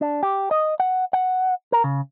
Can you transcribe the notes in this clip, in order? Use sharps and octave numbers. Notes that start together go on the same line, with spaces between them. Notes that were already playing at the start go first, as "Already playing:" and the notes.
D4
G4
D#5
F#5
F#5
A#4
C#3